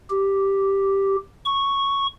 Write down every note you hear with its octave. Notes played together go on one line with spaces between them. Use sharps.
G4
C#6